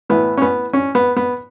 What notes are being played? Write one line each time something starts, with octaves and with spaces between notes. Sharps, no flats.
A2 E3 B3
C#4
B3
C#4
B3
B3